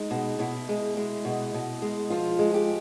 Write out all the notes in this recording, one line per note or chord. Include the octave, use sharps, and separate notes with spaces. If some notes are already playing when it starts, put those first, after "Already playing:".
Already playing: G#3 D#4
B2
B2 E4
G#3
G#3
B2
B2
G#3
F3 F4
G#3
G4